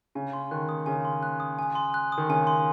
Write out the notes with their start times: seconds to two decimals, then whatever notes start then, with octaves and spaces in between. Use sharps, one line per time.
0.15 C#3 G#5
0.33 C6
0.51 D#3 F#6
0.69 D#6
0.86 C#3 G#5
1.05 C6
1.23 F#6
1.40 D#6
1.59 G#5
1.75 C6
1.94 F#6
2.12 D#6
2.18 D#3
2.29 C#3 G#5
2.47 C6